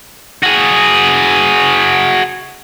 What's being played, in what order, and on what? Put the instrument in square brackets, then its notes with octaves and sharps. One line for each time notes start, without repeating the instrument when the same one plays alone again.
[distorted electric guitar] F#4 G#4